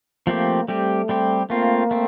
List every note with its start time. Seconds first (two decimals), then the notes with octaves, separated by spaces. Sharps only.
0.27 F3 A3 A#3 C4 G4
0.68 G3 A3 C4 G4
1.09 G3 C4 G4
1.50 A3 A#3 C4 F4
1.91 A3 C4